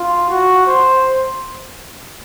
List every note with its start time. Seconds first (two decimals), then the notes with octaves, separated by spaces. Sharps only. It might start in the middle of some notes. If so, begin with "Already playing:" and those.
Already playing: F4
0.30 F#4
0.67 C5